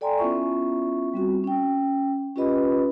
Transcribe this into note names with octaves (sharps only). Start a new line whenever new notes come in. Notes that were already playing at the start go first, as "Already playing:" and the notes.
A4 D5 G5 G#5 A#5 C6
B3 C#4 E4 F4 E5 C#6
G3 C4 F#4
C#4 G5
C#4 F4 G4 B4 D#5 B5